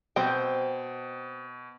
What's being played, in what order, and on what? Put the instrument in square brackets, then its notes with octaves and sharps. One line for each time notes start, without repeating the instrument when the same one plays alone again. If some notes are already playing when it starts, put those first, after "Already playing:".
[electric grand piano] B2 [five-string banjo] C4 C5 G5